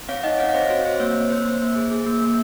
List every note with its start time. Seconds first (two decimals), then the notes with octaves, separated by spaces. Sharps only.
0.09 C4 C#5 F5
0.23 D#4 D#5 F#5
0.39 C4 C#5 F5
0.49 F5
0.54 C4 C5 D#5
0.69 F#4 C#5
0.85 C4 C5
1.00 A#3 C#5
1.15 A#3
1.30 A#3 C5
1.45 A#3
1.61 A#3
1.76 G#4
1.91 G#4
2.06 A#3
2.22 A#3